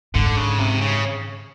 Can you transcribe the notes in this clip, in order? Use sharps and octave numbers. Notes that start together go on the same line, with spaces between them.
G#2 D3
C#3
C3
C#3